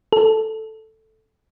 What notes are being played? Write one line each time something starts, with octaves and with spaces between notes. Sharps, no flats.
A4